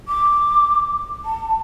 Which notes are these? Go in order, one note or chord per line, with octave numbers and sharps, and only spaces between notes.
D6
A5